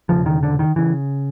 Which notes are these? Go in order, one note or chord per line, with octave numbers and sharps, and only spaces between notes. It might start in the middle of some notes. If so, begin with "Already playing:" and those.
E1 D#2 C#3 F3
D#3
D3
D#3
C#3 E3